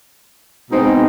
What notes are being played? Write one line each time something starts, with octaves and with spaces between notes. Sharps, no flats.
B2 G#3 C4 D#4